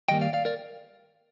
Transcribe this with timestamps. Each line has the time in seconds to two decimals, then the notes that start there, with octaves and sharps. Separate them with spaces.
0.08 G2 D#3 G3 A#3 D#5 G5
0.21 D5 F5
0.33 D5 F5
0.45 A#4 D5